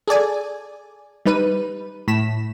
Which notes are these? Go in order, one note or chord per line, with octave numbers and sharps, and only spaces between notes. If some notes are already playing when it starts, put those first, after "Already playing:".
G#4 A4 D5 G#5
G3 D#4 B4 D#7
A2 B6 E7